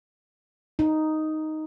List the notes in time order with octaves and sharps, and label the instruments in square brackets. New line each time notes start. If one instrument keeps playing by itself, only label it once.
[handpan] D#4